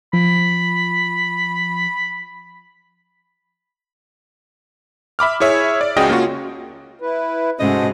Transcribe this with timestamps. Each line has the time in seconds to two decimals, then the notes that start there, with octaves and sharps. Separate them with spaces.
0.13 F3 B5
5.19 E5 B5 D6 F6
5.40 E4 G#4 C#5 E5
5.81 D5
5.97 C#2 C#3 F#4 G#4 D#5 G5
6.10 A#3 C#4 F4 F#4
7.01 E4 B4
7.60 G#2 C3 C#4 F#4 A4 C5 D#5